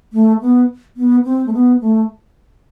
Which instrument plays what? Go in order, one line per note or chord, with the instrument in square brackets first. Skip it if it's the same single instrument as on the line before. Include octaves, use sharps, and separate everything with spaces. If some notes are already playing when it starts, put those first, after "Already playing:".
[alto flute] A3
B3
B3
C4
A3
B3
A3